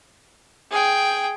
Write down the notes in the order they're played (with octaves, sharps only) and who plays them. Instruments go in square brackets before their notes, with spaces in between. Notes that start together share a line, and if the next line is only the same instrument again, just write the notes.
[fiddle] G#4 G5